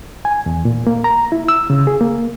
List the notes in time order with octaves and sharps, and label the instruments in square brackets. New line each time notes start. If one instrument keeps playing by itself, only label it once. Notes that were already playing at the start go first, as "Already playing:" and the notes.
[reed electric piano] G#5
E2
A#2
A#3
A#5
E4
E6
C#3
G#4
A#3